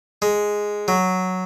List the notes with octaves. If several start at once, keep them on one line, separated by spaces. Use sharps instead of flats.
G#3
F#3